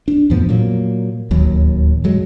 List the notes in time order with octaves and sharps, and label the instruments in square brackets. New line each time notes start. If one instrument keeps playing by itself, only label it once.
[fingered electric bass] D4
F2 A2 F3 B3
A#2 F#3 A#3
D1 D#2 F#3
F#2 F#3 G#3